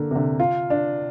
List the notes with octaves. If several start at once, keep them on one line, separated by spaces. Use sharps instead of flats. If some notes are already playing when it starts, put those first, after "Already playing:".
Already playing: D3 A#3
C3
D3
F4
D4